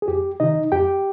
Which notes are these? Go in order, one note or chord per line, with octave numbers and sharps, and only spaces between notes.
G#4
F2 G4
C3 D#3 D#4 D#5
F2 G4 G5